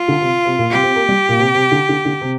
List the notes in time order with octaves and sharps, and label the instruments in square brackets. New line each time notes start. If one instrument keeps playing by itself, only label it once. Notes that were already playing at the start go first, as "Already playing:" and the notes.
Already playing: [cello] F4
[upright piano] D3
C3
C3
A#2
[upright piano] C3 [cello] G4
[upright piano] C4
A#3
G3
A#2
C3
C3
D3
D3
D3
C3